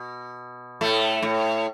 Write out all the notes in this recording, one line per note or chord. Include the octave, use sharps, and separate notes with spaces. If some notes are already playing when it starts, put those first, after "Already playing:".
Already playing: B2
A2 A3
A2